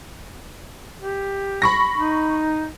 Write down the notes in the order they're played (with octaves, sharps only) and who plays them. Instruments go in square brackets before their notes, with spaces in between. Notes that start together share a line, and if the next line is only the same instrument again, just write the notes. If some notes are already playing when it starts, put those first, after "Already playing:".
[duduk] G4
[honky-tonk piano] B5 C#6 A#6
[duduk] D#4